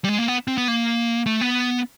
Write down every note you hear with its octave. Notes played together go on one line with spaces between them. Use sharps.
G3
G#3
A#3
B3
C4
B3
A#3
A3
B3